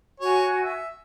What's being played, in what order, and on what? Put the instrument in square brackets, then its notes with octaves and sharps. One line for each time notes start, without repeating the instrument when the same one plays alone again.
[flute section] F#4 G#5 [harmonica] C#5
[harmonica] E5